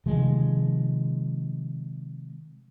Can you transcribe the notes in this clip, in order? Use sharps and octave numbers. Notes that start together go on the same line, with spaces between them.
C3 D#3 F3 G#3